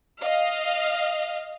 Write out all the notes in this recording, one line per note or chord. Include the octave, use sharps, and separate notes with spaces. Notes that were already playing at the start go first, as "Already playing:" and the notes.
D#5 F5